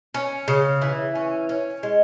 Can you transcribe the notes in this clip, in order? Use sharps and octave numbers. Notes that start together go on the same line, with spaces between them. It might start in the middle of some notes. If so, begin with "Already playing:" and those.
C#4
C#3
E3
C#4
C#4
G#3